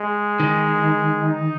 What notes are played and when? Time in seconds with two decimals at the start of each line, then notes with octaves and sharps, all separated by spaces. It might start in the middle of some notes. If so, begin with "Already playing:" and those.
Already playing: G#3
0.40 D#3
1.21 D#4